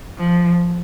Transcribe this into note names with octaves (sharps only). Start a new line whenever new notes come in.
F3